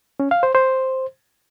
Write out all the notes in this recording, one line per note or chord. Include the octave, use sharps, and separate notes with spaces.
C#4
F5
C5
C5